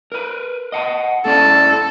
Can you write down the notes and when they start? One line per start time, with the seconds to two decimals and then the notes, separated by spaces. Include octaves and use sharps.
0.12 A#4 B4
0.72 D#5 F#5 A5
1.25 A2 C#4 A4 D5